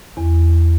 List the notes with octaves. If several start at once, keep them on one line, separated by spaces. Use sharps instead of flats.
E2